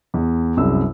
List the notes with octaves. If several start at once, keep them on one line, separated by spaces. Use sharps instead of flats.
E2
C2 F#2 G#3 E6